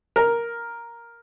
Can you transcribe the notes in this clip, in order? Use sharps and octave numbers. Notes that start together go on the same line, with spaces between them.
A#4